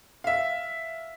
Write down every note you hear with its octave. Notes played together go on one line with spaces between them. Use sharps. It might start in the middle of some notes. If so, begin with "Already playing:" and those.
E5 F5